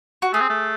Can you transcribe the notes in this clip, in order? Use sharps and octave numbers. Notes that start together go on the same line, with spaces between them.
F#4
A3 G#4
C4
A3